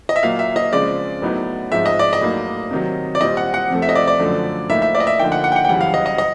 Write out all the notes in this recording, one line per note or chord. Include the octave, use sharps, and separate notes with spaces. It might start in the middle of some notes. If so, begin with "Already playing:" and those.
D#5
E5
A#2 F#3 A#3 F5
E5
D#5
C#3 F3 G#3 C4 D5
A2 F#3 B3 D#4
G#2 F3 G#3 C4 D#4 E5
D#5
D5
D#5
A2 F#3 A#3 D#4
C3 D#3 F#3
D5
A#2 G3 C4 D#5
F#5
F#5
F2 C3 F3 A3
E5
D#5
D5
D5
F#2 D3 F3 A3
A2 F3 A#3 D#4 E5
E5
D5
D#5
E5
D3 F3 A#3 D#4 G5
F#5
F#5
G5
F#5
G5
F#2 C#3 E3 G3 F#5
F5
D#5
D#5
D#5